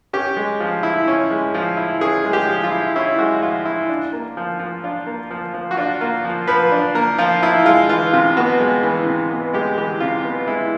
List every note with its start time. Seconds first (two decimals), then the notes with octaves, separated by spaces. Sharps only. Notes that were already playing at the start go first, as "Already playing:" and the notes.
0.13 C#4 G4
0.37 G#3
0.60 F3
0.83 E4
1.08 C#4
1.31 G#3
1.54 F3
1.77 E4
2.01 C#4 G#4
2.25 G#3
2.33 G4
2.48 F3
2.64 F4
2.71 E4
2.96 C#4 E4
3.18 G#3 F#4
3.42 F3 F4
3.65 E4
3.89 D4
4.13 A#3
4.37 F3
4.59 F3
4.84 D4 F4
5.06 A#3
5.31 F3
5.54 F3
5.71 F#4
5.77 D4 F4
6.01 A#3 F4
6.25 F3
6.47 F3 B4
6.72 D4
6.95 A#3 A#4
7.18 F3 F4
7.42 F3 E4
7.65 G#3 F4
7.89 E3 F4
8.13 C3 F4
8.37 B3 F#4
8.60 G#3
8.83 E3
9.06 C3
9.30 B3
9.54 G#3 G4
9.78 E3 G4
10.00 C3 F4
10.24 B3
10.47 G#3 E4